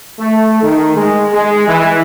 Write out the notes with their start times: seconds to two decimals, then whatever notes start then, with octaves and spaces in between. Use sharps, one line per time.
0.19 A3
0.62 D#3
0.96 G#3
1.33 G#3
1.68 E3